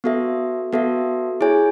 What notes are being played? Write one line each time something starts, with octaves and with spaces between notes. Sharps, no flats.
B3 F#4 A4 E5
B3 F#4 A4 E5
E4 G#4 C#5 G#5